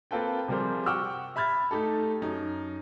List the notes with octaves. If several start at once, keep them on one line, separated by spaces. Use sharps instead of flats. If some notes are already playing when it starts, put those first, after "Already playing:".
A#3 C4 F4 A4 B4 G5
C3 F3 G3 G#4 A#4 C5
F#5 G5 C#6 D6 E6 F6
E5 B5 F6 G#6 A6
A3 D#4 G4 A4
F#2 D#4